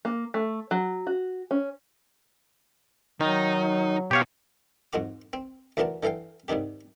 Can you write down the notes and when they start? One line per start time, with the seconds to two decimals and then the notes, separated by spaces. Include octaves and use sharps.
0.05 A#3
0.34 A3
0.71 F#3
1.07 F#4
1.51 C#4
3.21 D#3 F#3 D#4
4.11 B2 G4 C#5 F5
4.93 F2 G#2 G#3 F#4 D6
5.33 C4
5.77 D2 E3 D4 A#4 F#5 A5
6.03 D3 E3 A4 F5 G5
6.48 G#2 C3 D#3 D4 G4